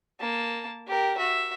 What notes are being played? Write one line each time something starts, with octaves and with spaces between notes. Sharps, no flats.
A#3 A5
G4 A#4
F#4 E5